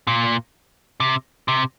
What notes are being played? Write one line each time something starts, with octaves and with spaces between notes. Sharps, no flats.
A#2
C3
C3